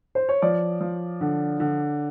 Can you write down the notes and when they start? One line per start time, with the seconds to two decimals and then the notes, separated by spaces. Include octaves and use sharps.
0.15 C5
0.29 C#5
0.42 F3 D5
0.81 F3
1.21 D3
1.60 D3